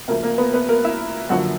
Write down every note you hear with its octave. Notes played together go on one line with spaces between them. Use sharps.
D2 C#3 F3 A3 A#3 A#4
A#3 A#4
B3 B4
B3 B4
A#3 A#4
E4 E5
F#2 D3 F3 A#3 F#4 F#5